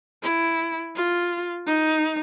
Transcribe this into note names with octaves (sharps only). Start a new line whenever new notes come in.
E4
F4
D#4